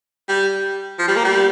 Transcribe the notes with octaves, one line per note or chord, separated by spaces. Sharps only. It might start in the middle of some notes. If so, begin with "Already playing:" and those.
G3
F3
G3
A#3
G3